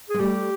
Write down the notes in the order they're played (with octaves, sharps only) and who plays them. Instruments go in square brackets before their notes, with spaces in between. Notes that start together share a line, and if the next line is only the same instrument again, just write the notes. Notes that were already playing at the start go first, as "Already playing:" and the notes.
[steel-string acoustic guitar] G#3 [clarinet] G#4
[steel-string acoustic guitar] G3 A3 [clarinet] G4